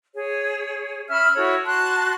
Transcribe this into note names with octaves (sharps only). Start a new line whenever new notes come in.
G#4 C#5
C#4 E5 B5 F6
E4 F#4 A4 C#5
F#4 A5 C6 F#6